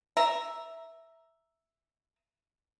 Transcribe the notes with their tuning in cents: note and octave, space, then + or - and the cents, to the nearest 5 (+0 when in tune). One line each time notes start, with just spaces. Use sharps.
E5 +0 A#5 +0